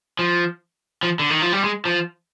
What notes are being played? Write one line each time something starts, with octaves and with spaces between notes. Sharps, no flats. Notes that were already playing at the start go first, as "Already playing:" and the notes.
F3
F3
D3
D#3
F3
G3
G#3
F3